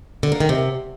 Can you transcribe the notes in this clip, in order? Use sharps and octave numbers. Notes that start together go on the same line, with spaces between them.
D3
A#3
D#3
C3